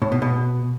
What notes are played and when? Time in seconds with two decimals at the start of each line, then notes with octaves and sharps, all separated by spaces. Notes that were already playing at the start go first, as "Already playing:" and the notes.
0.02 A2
0.12 B2
0.22 B2